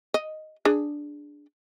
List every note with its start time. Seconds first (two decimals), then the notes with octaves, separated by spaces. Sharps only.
0.14 D#5
0.65 D4 G#4